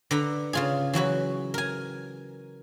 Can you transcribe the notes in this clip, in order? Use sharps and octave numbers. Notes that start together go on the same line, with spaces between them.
D3 B4 A#5
C#3 F4 G#4
E3 F#3 F#4 B4
A#4 G#5